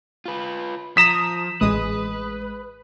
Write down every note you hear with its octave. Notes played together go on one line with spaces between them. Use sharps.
F4 B4
F3 A#5 D#6 B6 E7
A1 G#3 B4 D#6